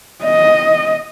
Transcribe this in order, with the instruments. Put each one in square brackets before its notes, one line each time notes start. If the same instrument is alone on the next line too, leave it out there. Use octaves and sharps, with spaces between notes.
[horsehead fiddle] D#5